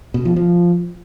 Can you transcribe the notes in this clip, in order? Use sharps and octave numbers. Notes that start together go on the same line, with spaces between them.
B2
F3
F3